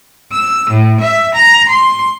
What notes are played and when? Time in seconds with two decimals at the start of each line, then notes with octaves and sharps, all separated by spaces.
0.32 E6
0.69 A2
1.00 E5
1.34 A#5
1.68 C6